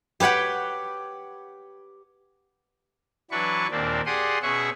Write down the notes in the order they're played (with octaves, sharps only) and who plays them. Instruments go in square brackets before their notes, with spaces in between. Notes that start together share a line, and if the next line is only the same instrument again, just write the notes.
[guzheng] G4 B4 C#5 F#5 G5
[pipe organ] E3 F#3 D4 B4 C#6
D#2 A#2 A#3 C4 D4
G4 G#4 D5 F#5 C6 D#6
B2 C#4 G#4 E5 F#5 C#6